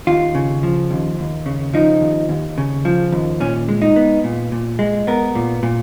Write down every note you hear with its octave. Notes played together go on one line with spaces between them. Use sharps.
D#2 F4
C#3
F3
D#2
D#2
C#3
F3 D#4
D#2
D#2
C#3
F3
D#2
A#2 C#4
G#3
D#4
B3
A#2
A#2
G#3
B3 A#4
A#2
A#2